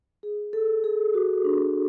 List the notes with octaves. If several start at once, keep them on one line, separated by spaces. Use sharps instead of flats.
G#4
A4
G#4
F#4
D4